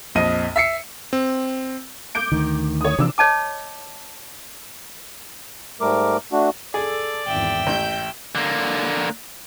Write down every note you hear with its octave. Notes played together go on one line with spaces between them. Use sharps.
A#1 F2 D#5 D#7
E5 C7 C#7
C4
D6 G6 D7
D2 D#3
C#5 D#6
C3 E3 F3 D4 D6 E6
C#5 D#5 A5 D6
G#2 G3 A3 A#4 D6
A3 D4 F#4
G#4 A4 D5
G#1 E2 E5 G5
A1 G6
D3 A#3